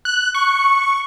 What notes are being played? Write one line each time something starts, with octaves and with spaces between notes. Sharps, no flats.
F#6
C#6